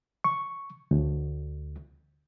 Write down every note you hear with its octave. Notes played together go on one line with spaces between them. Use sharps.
C#6
D2